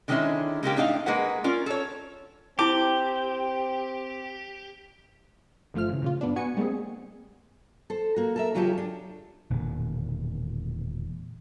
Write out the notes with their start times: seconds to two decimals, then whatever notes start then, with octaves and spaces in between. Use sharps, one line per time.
0.08 D3 D#3 G#3 B3 C#4 E4
0.63 C#3 G#3 A#3 G4
0.76 A2 D4 D#4 F4 F5
1.06 G#3 A#3 G#4 B4 F#5
1.44 C#4 F4 A#4 D5
1.66 A4 C#5
2.59 C4 E4 G4 A5 D6
5.74 G1 F3 A3 F4 F6
5.89 C#3 E3
6.02 A#2 C#3 F4
6.21 G2 B3 D4
6.36 B3 F#4 G#5 C#7
6.57 G3 G#3 A#3 C4 G#4
7.90 A4 C5
8.16 A#3 F#4
8.36 A4 A#4 E5
8.55 C#3 F#3 G#3 F4 G4 A4
8.78 D4
9.50 E1 A#2 D3 D#3